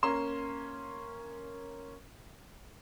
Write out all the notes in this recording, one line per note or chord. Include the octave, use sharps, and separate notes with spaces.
A#3 C#4 A#5 C6 E7